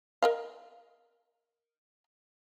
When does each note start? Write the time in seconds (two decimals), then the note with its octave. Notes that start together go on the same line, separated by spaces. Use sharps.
0.22 A#4 D#5 F5